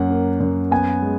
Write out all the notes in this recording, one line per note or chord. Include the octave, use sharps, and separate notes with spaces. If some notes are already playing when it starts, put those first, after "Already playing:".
Already playing: F#2 A#3 F#5
A#3
F#2
B3 G#5
G#3